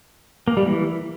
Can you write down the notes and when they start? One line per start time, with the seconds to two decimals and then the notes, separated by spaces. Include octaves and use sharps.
0.48 A#3
0.57 G3
0.66 E3